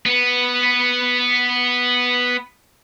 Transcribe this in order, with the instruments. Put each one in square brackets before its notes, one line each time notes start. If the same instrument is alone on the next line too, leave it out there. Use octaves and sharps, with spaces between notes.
[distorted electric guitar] B3 B4